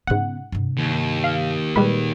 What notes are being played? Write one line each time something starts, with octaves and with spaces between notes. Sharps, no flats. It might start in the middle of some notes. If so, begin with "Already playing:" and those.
G#2 C#3 B3 F#5
G2 C3
D#2
F5
A#2 G3 G#3 B4